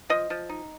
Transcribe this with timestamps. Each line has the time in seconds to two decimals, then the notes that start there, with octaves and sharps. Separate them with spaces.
0.10 F3 D#5
0.30 F3
0.49 D#4